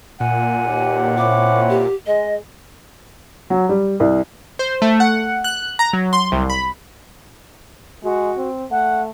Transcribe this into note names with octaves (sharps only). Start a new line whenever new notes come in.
A#2 F#5 G#5
D#2 B2 G4
C4 C#4 E4 D6
G4
G#3 D#5
F#3
G3
C2
C5
A3
F#5
F#6
A#5
F#3
C6
C2
B5
G#3 F#4
C4
A3 F#5